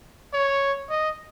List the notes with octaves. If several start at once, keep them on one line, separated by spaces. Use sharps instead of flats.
C#5
D#5